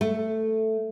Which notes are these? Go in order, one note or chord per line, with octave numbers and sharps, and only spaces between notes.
A3